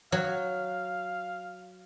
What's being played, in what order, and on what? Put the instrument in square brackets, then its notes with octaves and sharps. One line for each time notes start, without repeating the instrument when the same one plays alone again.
[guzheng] F#3 [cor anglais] F5